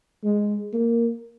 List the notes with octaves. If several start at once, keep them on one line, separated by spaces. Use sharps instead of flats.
G#3
A#3